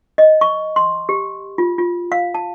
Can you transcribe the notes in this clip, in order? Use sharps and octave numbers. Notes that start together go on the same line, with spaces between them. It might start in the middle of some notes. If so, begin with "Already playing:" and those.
D#5
C#6
C6
G4
F4
F4
F5
A5